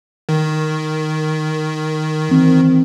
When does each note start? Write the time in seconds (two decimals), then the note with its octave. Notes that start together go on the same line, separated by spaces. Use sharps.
0.29 D#3
2.29 E3 C4